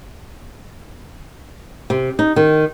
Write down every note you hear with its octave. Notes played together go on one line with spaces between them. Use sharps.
C3
D#4
D#3